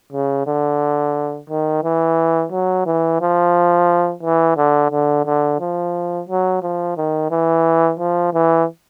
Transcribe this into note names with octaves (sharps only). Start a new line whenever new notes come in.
C#3
D3
D#3
E3
F#3
E3
F3
E3
D3
D3
D3
F3
F#3
F3
D#3
E3
F3
E3